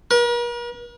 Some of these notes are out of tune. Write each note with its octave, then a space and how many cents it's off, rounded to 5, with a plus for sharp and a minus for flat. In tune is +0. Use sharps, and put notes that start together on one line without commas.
A#4 +45